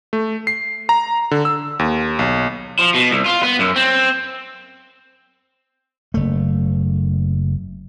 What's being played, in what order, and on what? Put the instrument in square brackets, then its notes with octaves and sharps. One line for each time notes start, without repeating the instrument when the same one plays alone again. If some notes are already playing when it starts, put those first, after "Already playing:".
[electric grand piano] A3
C7
A#5
D3
E6
D#2
B1
[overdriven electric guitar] F3
B2
C2
F4
B3
F#2
C4
[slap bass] F#1 A3